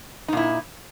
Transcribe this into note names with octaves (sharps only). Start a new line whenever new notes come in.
A#2 D#4 E4